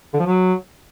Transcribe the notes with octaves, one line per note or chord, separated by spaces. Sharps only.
D3
F3
F#3